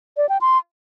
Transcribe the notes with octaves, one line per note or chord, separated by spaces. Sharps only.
D5
G5
C6